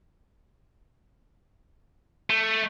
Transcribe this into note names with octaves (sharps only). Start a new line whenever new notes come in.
A3